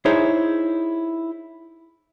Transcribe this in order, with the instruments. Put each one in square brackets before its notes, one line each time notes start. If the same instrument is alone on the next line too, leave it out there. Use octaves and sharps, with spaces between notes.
[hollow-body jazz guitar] D#4 E4 G#4 C5 C#5